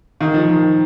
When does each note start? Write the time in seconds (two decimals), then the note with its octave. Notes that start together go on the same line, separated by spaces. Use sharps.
0.21 D#3
0.34 F3
0.50 D#3